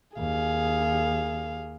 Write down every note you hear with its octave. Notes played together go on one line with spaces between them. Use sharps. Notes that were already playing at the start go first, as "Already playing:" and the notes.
D#2 G#4 F5